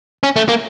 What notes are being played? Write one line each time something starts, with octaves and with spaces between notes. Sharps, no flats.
C#4
A3
A#3